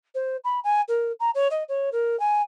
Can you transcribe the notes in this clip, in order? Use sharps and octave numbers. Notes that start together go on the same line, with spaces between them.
C5
B5
G#5
A#4
A#5
C#5
D#5
C#5
A#4
G#5